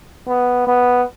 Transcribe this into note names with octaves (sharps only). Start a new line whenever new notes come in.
B3
B3